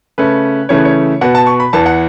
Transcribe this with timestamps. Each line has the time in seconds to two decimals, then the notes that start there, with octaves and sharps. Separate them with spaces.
0.18 C#3 A3 C#4 B4
0.69 C#3 E3 A3 C#4 C#5
0.78 B4
0.85 C#5
1.21 B2 B3 F#5
1.35 A5
1.47 C#6
1.60 B5
1.73 E2 E3 B3 A5
1.86 F#5